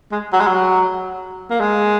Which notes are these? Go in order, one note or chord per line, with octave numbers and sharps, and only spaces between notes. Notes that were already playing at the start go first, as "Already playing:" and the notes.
G#3
F#3
G#3
F#3
A#3
G#3